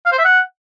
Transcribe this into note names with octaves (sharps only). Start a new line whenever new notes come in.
F5
C5
E5
F#5